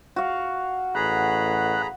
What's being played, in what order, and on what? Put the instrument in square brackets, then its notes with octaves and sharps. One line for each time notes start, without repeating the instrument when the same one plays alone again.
[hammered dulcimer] F#4 F5
[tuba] A1 [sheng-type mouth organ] G#4 A#5 B5 [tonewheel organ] F#5